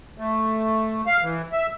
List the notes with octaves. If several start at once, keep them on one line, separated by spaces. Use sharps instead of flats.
A3
F5
E3
E5